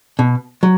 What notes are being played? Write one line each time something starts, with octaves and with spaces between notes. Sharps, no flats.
B2
F#3